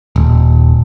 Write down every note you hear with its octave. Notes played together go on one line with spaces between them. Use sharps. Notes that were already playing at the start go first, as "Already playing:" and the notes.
D#1